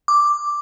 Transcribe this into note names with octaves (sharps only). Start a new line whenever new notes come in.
D6